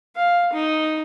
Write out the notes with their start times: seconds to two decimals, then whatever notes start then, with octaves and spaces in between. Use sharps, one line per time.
0.16 F5
0.53 D#4